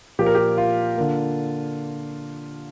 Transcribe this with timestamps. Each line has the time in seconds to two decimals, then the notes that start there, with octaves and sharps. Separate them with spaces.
0.19 A#2 F3 A#3 G4
0.26 A#4
0.35 G4
0.58 F4
0.97 D3 A#3